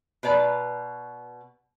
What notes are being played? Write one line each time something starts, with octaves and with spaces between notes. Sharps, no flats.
B2 B4 D5 A#5